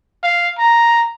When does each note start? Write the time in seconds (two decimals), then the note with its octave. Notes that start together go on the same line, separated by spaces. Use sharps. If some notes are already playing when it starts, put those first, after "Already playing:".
0.23 F5
0.58 A#5